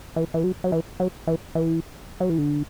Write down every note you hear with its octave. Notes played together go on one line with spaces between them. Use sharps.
E3
E3
F#3
F#3
E3
F#3
E3
E3
F#3
E3
D3